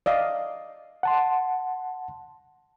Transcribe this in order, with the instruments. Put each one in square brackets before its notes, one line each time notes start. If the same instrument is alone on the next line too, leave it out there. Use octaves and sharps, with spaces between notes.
[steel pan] D5 D#5 F5
[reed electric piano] F#5 A5 C6